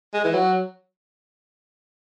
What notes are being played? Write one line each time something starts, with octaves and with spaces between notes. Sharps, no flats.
G#3
E3
F#3